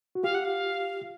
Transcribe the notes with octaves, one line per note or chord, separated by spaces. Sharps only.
F#4
F4 G4 F5
F#5
F5